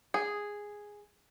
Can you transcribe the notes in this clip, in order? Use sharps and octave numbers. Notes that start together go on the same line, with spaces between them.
G#4